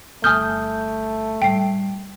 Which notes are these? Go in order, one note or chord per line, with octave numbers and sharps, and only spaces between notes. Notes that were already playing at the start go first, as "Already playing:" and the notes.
G1 A3 E4 G#5 D#6 F6 G6
A2 G3 G5 C7